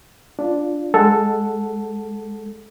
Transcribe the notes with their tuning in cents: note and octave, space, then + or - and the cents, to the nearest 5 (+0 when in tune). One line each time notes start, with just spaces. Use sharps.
D4 +0 F4 +0
G#3 +0 A4 +0 F#5 +0